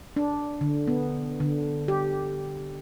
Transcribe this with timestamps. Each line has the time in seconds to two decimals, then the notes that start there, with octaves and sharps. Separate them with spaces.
0.16 D4
0.61 D3
0.88 B3
1.40 D3
1.88 G4